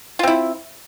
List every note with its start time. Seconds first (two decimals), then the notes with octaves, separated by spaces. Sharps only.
0.19 F4
0.23 C4
0.28 E4